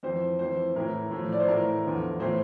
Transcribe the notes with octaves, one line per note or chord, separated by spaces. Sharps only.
F2 E3 C5
F2 E3 C5
A2 E3 A#4
A2 F3
D5
C5
A2 E3 A#4
E2 D3 F3
A2 E3 C5